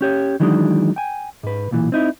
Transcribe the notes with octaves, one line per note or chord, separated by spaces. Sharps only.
C#4 G4 C#5
D#3 E3 F#3 G#3 D4 D#4
G5 G#5
G#2 B4
B1 A#2 E3
C4 D#4 E4